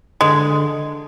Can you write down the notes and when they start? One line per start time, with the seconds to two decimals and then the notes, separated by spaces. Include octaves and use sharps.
0.21 D3 G#3